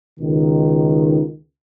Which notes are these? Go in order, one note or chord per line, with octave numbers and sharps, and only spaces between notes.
C#2 B2 D#3